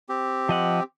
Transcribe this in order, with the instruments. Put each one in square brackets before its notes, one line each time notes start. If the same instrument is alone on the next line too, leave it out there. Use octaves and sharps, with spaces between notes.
[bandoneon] C4 G4
[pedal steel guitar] F3 D#5 F#5